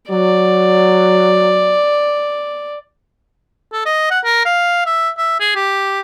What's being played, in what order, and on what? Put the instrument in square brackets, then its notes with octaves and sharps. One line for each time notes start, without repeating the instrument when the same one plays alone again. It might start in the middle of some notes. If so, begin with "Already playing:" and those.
[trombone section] F#3 [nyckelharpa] D5
[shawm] A4
D#5
F#5
A#4
F5
E5
E5
G#4
G4